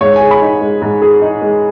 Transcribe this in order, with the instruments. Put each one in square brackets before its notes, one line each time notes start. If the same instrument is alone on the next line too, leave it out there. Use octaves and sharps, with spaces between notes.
[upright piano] G#2 [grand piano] C#5
[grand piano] G#5
[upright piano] G#4
[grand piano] B5
[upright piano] D#4
G#3
G#2
G#4
D#4
G#3